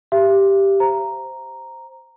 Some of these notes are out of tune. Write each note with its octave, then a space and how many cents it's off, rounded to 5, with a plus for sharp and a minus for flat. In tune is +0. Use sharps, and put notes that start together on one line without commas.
G4 +0 E5 +40
C5 +0 A#5 +0